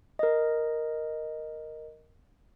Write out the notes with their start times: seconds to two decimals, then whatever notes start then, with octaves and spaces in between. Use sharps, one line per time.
0.19 A#4 D#5